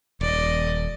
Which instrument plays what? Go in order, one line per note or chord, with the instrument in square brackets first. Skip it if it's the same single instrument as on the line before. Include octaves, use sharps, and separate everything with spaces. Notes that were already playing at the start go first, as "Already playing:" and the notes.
[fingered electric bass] D#1 [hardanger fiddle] D5 D#5